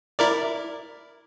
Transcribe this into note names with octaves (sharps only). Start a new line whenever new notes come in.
E4 A#4 D5